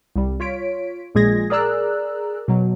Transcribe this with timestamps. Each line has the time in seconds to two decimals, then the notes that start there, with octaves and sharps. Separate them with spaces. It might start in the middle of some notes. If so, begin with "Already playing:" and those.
0.16 C2 G3
0.40 F4 C#5 B6 D7
1.15 A#1 A#2 G#3 G#4 G#6 A#6
1.50 G#4 A#4 D5 A#5 E6 F#6
2.48 B2 F#3